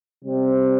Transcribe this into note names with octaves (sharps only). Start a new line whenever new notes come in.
C3 G3 C4